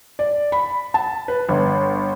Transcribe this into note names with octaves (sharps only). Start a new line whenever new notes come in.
D5
B5
A5
B4
G1